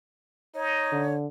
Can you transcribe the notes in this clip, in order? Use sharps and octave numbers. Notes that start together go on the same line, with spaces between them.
D#4 C#5
D3